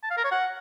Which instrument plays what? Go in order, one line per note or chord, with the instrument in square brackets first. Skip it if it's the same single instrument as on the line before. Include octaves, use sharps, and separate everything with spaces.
[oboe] A5
F5
A#4
C#5
F#5